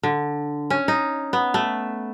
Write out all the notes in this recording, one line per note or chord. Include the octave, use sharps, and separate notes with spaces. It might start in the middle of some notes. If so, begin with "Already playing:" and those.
D3
C#4
D#4
B3
A3